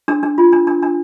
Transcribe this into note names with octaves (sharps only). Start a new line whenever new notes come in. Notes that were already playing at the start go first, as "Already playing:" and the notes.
D4
D4
F4
D4
D4
D4